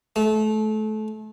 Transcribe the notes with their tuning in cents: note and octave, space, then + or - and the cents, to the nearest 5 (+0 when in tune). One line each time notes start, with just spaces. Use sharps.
A3 -30